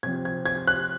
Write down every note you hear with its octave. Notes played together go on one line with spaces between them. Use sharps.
C3 F3 C4 G#6
G#6
G#6
F#6